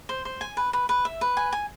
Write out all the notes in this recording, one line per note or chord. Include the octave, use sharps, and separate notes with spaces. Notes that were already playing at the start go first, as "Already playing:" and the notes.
C5
C5
G#5
B4
B4
B4
E5
B4
G#5
G#5